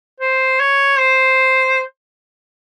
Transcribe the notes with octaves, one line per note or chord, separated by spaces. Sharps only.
C5
C#5
C5